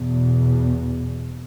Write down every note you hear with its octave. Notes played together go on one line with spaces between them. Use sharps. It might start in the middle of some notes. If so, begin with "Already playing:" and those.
Already playing: E2 B2